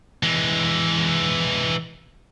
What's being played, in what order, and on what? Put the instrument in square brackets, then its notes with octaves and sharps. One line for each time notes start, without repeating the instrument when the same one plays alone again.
[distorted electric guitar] E3 G#3